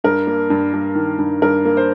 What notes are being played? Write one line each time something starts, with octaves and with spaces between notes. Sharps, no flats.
G2 A#4
A#3
G2
G2
D#3
G2
G2 A#4
A#3
C5